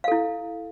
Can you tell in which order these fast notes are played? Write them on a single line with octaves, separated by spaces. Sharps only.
F5 A4 E4